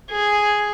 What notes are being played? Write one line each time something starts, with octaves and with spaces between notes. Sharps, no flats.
G#4